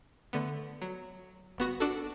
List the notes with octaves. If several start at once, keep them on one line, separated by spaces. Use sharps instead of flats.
D3 A3 B3
F#3
G1 B3 F#4 A#6
D4 F#4 A4